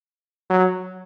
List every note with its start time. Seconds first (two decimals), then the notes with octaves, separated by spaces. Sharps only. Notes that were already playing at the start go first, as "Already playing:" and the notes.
0.50 F#3